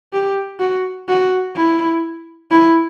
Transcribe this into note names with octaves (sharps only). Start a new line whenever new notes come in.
G4
F#4
F#4
E4
E4